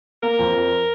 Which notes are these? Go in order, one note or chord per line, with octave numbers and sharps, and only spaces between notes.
A#3 A#4
F2
F2